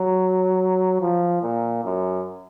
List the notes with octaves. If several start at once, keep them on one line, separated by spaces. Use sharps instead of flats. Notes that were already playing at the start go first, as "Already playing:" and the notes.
Already playing: F#3
F3
A#2
F#2